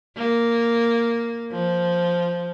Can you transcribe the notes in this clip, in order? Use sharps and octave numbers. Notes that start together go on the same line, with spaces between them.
A#3
F3